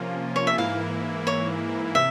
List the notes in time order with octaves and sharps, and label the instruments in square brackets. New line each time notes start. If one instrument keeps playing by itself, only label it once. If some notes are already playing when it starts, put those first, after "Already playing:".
Already playing: [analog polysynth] C3 F3 A#3 C#4 F4
[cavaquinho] C#5
E5
[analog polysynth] G#2 E3 A#3 E4 [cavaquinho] F5
[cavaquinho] C#5
[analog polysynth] C3 [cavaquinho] E5